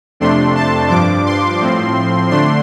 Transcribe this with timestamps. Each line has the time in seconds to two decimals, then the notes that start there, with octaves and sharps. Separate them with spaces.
0.20 F2 C3 A3 D4 C6
0.55 A5
0.90 G2 F3 D4 D6
1.26 C6
1.60 A2 F3 C4
2.30 D3 A3 D4 C6